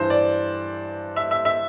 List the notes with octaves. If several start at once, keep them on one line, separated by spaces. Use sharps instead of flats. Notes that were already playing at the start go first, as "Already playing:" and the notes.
Already playing: G2 E3 C5
D5
E5
E5
E5